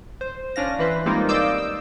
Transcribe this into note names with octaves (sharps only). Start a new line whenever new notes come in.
C5
G1 C#4 D4 F5 A#6
E3 B4 C5
G3 G#3 A#3 C4 D#4 F4
D5 D#5 F5 D6 E6 G6
E6